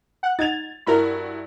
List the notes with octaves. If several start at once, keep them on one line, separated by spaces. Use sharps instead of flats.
F#5 F#6
D#4 F#5 G#6 A6 F7
G2 E4 F#4 A#4 B5